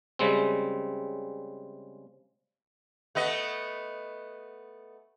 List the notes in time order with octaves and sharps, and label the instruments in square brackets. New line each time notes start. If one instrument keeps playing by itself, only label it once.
[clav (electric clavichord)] C#3 G3 G#3 C4
[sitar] A3 B3 D#5